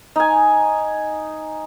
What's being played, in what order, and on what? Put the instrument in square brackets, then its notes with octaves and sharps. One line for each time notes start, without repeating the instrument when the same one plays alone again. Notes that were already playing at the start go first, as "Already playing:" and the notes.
[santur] D#4 G#5